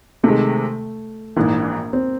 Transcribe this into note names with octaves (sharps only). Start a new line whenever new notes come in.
C3 D#3 G#3 A3
A#1 G#2 E3 A#3
C4